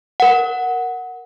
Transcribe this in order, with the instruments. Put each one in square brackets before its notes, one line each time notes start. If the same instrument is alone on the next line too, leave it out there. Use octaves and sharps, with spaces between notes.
[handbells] A#4 F#5